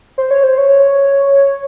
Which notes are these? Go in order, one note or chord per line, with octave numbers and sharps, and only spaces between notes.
C5
C#5
C5
C#5